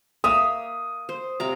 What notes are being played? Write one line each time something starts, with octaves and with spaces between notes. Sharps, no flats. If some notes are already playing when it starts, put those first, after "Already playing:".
A#3 E5 F5 D#6
C5
C3 F5 A#5